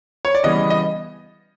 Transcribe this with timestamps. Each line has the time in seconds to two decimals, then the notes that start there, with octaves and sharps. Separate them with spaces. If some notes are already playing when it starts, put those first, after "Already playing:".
0.25 C#5
0.35 D5
0.43 C#3 E3 G3 B3 D#5
0.70 D#5